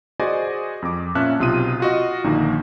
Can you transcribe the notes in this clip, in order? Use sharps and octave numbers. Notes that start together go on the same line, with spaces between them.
F#4 G#4 C5 D5 D#5 G#5
F2 D6
A#2 C#4 E5 A5 F#6
B1 C3 F4 D#6 D#7
F4 F#4 D#5
A#1 D3 D#3 A#3